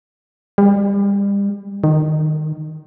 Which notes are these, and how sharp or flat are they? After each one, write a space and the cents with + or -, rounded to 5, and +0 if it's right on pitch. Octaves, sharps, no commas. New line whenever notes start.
G3 +35
D#3 -15